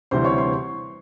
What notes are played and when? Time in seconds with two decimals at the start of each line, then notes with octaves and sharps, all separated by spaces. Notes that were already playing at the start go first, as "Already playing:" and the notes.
0.11 D2 C3 E3 G3 C5 C6
0.24 C#5 C#6
0.38 C6